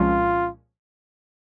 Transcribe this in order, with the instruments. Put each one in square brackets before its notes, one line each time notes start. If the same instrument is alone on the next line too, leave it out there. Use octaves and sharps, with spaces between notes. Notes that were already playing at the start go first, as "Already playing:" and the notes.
Already playing: [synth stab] C2 A#2 F3 G#3 C#4 [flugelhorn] F4